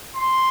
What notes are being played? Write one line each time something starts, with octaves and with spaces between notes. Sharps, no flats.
C6